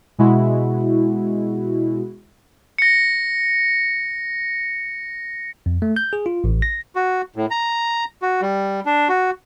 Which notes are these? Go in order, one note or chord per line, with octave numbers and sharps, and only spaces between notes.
B2 G#3 E4 F#4
A#6 C#7
F2
A3
G6
G#4
F4
A1
A#6
F#4
A2
A#5
F#4
G3
D4
F#4